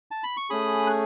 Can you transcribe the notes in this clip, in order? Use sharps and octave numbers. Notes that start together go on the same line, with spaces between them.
A5
B5
C#6
A3 C#4 G#4 B5 D#6
F#6